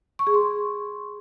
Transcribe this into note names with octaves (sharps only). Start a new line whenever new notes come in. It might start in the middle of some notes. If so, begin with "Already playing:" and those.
C#6
G#4
C6